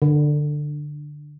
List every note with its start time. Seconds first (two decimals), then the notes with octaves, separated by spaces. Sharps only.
0.02 D3